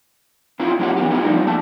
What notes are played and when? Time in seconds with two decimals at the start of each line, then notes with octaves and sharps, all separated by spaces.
0.60 A3 C4 E4 F4
0.79 F#3 A#3 C#4 E4 G4 F#5
0.97 E3 B3 G4
1.10 A3 B3 E4 F4
1.24 F3 G3 D#4
1.47 A3 A#3 A5